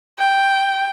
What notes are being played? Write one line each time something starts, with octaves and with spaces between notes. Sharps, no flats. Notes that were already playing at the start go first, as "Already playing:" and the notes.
G5